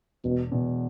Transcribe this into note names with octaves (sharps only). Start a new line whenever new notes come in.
E1 B2
E2 B2